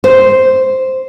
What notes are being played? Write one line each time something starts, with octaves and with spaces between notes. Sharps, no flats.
C5